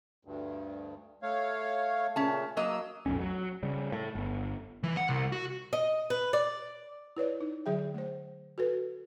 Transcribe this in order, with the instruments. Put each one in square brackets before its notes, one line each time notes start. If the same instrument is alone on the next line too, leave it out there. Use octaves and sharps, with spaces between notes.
[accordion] D2 G2
A3 C#5 F5
[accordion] A#2 C#3 A3 [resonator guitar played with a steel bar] C#4 A5
[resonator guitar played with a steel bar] F#3 A#3 D#5 [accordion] E6
[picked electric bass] B1 F2 A2 C#4
F#3
C#3 G3
A2
G1
[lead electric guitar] E3
F#5
C2
F#4
[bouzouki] D#5
B4
D5
[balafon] E4 B4 C#5 D5
D#4
D3 F#3 G#4 E5 G5
A3 C5
F#4 A4 B4